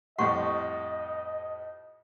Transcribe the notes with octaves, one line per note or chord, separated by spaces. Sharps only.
F2 A2 G3 D#5 F#5 C6 C#6